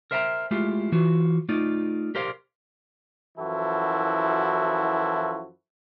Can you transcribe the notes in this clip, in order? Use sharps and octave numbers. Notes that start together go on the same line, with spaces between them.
A#4 C5 E5 G5 G#5 A#5
G#3 A3 E4 F4 G4
E3 F4 F#4
A3 D#4 F4 D5
G4 A#4 C5 D5 F5
F#2 E3 F3 E4 F#4 A4